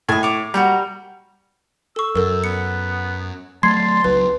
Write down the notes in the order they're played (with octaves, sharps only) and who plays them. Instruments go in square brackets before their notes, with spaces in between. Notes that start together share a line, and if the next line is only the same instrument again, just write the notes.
[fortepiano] A2 [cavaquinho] D#5 G#5
[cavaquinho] C#5 D6
[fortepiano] G3 [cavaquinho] F#4 A#4 A#5
[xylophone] A4 C#6 [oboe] E6
[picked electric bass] F#2 [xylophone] A4 A#4
[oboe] B3 [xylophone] C#7
[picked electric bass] F#3 A3 [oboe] A5 [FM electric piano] C6 [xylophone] G#6
[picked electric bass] C#2 F#3 [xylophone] B4